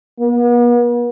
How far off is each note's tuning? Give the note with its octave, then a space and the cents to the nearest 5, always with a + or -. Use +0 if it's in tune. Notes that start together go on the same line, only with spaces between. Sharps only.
B3 -45